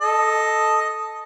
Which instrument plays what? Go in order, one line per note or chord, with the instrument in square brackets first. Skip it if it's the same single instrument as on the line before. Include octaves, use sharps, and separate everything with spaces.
[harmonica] A4 D#5